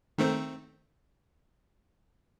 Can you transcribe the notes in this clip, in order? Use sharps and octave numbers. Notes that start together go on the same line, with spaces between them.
D#3 A3 C4